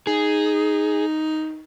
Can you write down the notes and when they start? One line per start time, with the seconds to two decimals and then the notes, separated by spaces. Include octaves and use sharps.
0.07 D#4 G#4